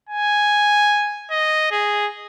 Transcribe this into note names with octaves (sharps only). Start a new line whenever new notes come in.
G#5
D#5
G#4